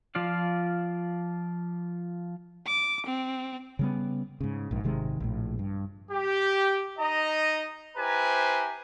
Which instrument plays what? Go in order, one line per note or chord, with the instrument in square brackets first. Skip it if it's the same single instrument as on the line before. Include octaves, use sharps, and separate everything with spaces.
[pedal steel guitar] F3 F4 D5 F5
[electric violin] D6
C4
[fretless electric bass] C#3 G3 B3
G#2 C#3
A#1 G#2
G#1 C3 D#3 G#3
A#1 A2
G2
[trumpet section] G4
D#4 D#5 A#5
E4 G4 B4 C5 G#5 A#5